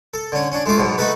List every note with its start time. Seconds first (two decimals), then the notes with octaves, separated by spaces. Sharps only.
0.14 A4
0.32 D3 C#4
0.52 C#4 D4
0.66 G#3 A3 F4 D6
0.78 B1 G#2 B2
0.98 A3 D#4 F#4 A4 B4